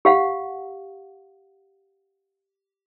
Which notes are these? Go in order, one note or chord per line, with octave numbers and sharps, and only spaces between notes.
G4 F5 F#5